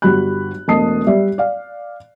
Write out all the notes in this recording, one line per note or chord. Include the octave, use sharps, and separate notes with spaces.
G1 F#4 G4 B5 F#6
E1 A3 D#5 A5 D#6 C7
G3 D5 E5
D5 F5